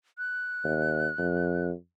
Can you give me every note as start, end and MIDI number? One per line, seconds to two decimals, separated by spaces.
0.18 1.67 90
0.64 1.07 39
1.18 1.72 41